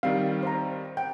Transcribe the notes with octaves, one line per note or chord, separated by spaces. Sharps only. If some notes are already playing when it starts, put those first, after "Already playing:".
D#3 G3 C4 F5
C5 F5 A#5
F#5 G5